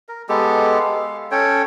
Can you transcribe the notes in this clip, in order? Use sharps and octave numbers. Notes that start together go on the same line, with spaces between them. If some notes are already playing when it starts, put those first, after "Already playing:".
A#4
G#3 B3 G4 A4
F5
C#4 A4 C#5 G5